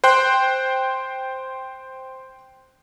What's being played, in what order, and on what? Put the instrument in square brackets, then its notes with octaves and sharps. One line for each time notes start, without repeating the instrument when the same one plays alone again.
[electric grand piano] C5 G5 C6 F#6